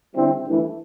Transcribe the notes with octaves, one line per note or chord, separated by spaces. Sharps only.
D3 G3 C4 E4
G2 E3 A3